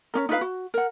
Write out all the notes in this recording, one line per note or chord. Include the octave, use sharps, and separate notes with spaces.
C#4 D#4 A#4
D#4 F4 B4 F5
F#4
A#4 F#5